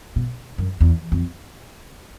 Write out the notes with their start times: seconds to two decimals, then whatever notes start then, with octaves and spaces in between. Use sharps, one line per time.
0.16 B2
0.58 F#2
0.81 E2
1.12 F2